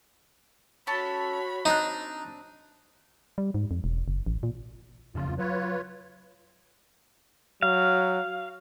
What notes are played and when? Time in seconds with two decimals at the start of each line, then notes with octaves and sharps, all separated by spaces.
0.87 C#4 F#4 A4 C#5 A5 B5
1.65 C4 D4 D#4 F#6
3.38 G3
3.54 G#2
3.71 F2
3.84 E1
4.08 F#1
4.26 A1
4.43 A#2
5.15 E1 F2 C#3 F4
5.38 F#3 F4 B4 C#5
7.62 F#3 F5